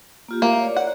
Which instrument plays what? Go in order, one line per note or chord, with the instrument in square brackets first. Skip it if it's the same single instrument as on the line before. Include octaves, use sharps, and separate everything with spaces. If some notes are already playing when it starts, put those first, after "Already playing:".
[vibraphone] A#3 F4 G4
[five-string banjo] A#3 [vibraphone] E5
[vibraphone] C#5 D5
[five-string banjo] F#5